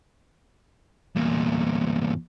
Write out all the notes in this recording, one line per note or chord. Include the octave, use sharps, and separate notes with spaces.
E2 A#2